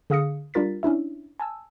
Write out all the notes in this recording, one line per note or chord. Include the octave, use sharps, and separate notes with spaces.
D3 G#4 F5 D#6 A#6 C#7
G3 D4 F4 A#4 A6 B6
C#4 D4 E4 E5
G#5 A5 E6